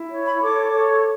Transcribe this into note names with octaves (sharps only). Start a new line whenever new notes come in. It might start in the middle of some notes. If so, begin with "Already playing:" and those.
Already playing: E4
C#5
B5
A4 D6
C#5